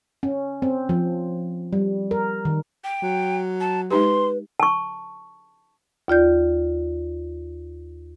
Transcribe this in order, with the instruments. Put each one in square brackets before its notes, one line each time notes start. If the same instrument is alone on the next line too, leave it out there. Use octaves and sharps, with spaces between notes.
[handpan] C#4
C4
F3
G3
A#4
D#3
[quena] G5
[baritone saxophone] F#3
[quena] A5
[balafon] G#3 D#4 G4 [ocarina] B4 [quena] C6
[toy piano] A5 C#6
[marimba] D#2 F4 D5 G6